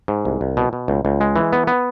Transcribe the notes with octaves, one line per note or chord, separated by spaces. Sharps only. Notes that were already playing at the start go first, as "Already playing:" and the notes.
G#2
C2
C2
B2
B2
C#2
C#2
G#3
E3
B3
B3